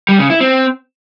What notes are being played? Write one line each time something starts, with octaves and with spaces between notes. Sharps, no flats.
G3
C#3
E4
C4